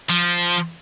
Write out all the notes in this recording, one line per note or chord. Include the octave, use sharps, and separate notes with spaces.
F3